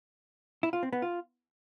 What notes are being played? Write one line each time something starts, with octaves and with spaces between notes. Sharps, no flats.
E4
F4
C4
B3
F4